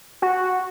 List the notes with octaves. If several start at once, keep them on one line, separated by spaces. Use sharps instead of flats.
F#4